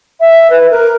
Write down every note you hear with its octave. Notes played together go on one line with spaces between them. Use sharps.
E5
B4
A#4